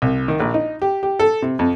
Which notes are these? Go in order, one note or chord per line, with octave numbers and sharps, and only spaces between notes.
C2
D#3
A#1
D#4
G4
G4
A4
C3
F2